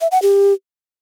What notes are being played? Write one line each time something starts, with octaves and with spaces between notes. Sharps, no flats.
E5
F#5
G4